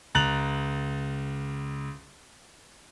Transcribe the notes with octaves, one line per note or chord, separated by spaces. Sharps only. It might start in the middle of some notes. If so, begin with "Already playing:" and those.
C#2 A#5 F#6 A6 F7 F#7